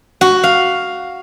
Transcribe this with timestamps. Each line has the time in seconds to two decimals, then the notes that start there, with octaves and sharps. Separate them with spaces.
0.21 F#4
0.44 F5